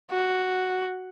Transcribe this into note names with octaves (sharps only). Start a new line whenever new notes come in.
F#4